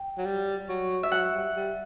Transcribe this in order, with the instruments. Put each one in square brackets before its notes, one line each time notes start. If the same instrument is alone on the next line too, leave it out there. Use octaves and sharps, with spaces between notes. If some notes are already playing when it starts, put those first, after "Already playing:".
Already playing: [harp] G5
[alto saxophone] F#3
G3
F#3
[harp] E5
[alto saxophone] F#3 [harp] F#5
[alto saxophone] G3
G3